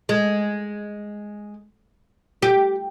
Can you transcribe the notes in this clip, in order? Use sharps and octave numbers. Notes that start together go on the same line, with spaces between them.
G#3
G4